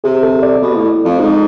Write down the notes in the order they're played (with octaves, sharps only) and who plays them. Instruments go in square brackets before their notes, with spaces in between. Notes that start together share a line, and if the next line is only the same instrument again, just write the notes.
[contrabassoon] C3 [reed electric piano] G#4
[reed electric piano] A4
D5
[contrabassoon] B2
A2
F2
G#2